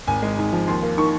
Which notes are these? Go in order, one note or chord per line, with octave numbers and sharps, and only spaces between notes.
G#1 G#5
G#3
G#2
F3
D#2 C6
A#3
D#3 C#6